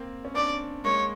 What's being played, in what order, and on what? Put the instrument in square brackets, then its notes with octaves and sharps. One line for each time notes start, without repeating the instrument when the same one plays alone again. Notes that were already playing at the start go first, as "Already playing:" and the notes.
Already playing: [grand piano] A#3 C4
C#4
[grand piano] C4 D4 [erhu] D5
[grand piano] G#3 A#3 [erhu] C#5